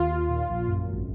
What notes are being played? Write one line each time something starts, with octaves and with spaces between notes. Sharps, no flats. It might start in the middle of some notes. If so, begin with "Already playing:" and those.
Already playing: D#2 F4
D#2
A#2
A#1
F#2
G#1